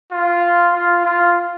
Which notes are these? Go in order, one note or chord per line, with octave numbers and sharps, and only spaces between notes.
F4
F4
F4